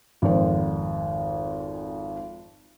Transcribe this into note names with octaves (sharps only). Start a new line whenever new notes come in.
G#1 F2 C5